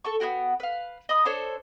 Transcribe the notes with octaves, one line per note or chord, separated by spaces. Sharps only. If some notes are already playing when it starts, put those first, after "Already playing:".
A4 A5 C#6
B3 E4 F#4 G5
B4 F5
D#5 B5 D#6
D4 A4 C5 C#5